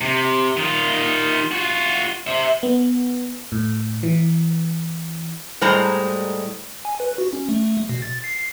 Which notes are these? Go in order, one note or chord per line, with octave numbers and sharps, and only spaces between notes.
C3
D#3 F4
F4 F#4
C5 E5
B3
A2
E3
A2 G3 G#3 C5 A#5
G#5
B4
F#4
C#4
A3
B2
A6
C7
C7